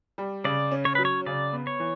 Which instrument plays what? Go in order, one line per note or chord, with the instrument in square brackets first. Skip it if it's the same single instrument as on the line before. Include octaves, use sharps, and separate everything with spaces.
[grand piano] G3
[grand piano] C#3 [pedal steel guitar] D5
[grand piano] C#4
[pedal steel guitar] C#5
[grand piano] F#3 [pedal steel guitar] B4
[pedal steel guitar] C#5
[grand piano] C#3 [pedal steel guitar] D5
[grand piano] B3
[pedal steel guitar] C#5
[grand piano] E3